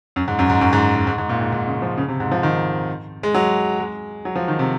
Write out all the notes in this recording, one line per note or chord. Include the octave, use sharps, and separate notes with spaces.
F#2
G#2
F#2
G#2
F#2
G#2
G#2
G#2
G#2
A#2
G#2
G#2
C#3
F3
C#3
C3
G#2
F3
D#3
G#3
F#3
G#3
F#3
F3
D#3
C3